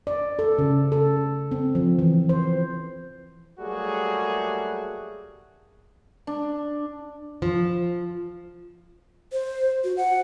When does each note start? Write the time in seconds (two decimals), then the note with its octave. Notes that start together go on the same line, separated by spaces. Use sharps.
0.07 D5
0.39 A4
0.58 C#3
0.92 A4
1.51 C4
1.75 F3
1.99 E3
2.29 C5
3.59 F#3 G3 A3 A#3 F#4 G#4
6.27 D4
7.42 F3
9.33 C5
9.84 F#4
9.97 F#5